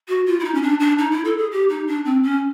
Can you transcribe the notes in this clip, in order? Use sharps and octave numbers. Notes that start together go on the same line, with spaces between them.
F#4
F4
E4
D#4
C#4
D4
D4
D#4
E4
A4
G#4
G4
D#4
D4
C4
C#4